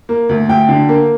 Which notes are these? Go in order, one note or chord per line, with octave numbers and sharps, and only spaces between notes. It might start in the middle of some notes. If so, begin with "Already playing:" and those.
A#3
D2
D2 G5
D3
A#3